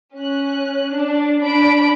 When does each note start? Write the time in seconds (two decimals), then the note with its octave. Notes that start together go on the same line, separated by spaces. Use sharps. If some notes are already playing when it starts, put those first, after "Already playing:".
0.16 C#4 F#6
0.93 D4
1.42 D4 B5 D7